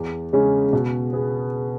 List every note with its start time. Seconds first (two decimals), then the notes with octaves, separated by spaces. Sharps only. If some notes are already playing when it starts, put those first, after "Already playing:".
Already playing: E2
0.33 C#3 G#3 C#4
0.73 B2
1.13 B3 G#4